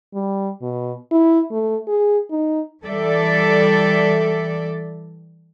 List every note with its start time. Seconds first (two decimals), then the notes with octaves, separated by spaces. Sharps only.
0.14 G3
0.62 B2
1.12 E4
1.51 A3
1.88 G#4
2.31 D#4
2.84 E3 G3 A4 D5 E5